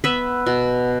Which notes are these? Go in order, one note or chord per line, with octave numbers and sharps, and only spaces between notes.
B3 B4 E5
B2